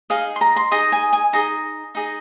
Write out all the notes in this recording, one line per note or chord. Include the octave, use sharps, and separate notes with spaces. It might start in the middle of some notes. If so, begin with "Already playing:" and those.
D#4 G#4 D#5 F5
C6
A#5
C6
D#4 G#4 D#5 A#5
G#5
G#5
D#4 G#4 D#5 A#5
D#4 G#4 D#5